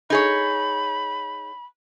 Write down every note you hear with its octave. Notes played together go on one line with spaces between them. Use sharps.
D#4 G#4 C#5 B5